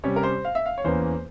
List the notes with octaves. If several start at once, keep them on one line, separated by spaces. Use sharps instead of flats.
C3 G3 C#4 G4 C#5
A#4
C5
F5
E5
F5
C#5
E2 E3 A#3 C#4 C5